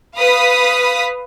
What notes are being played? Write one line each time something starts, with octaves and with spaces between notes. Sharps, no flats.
B4 F5 D#6 B6